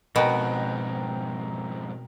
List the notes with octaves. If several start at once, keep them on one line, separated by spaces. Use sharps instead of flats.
F2 G#2 B2 A#4 G5 F#6